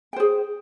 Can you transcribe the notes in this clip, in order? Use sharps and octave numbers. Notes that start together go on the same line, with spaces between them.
G#4 C5 G5